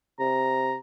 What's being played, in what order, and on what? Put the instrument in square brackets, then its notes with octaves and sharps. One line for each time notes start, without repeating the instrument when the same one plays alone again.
[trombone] C3 [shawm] A#5